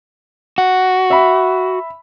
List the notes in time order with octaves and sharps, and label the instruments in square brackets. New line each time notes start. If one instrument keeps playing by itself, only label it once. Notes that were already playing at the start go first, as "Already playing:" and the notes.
[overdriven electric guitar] F#4
[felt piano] E5 B5